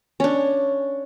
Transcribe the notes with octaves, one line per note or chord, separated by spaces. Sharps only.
C#4 D4